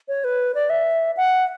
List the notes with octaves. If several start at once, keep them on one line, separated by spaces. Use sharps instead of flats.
C#5
B4
D5
E5
F#5